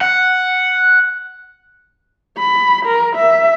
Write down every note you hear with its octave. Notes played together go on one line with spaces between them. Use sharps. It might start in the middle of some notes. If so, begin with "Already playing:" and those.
F#5
B5
A#4
E5